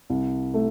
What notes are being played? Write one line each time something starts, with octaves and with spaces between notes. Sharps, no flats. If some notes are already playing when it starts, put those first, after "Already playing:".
C2
A3